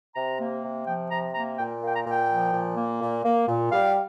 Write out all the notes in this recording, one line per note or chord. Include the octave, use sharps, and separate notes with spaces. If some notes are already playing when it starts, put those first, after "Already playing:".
C3 A#5
A#3
C3
F3 G5
C3 A#5
A#3 A#5
A#2 G5
A#3
G5
A#5
A#2
G5
F3
A#2
A#3
A#2
A#3
A#2
G3 F5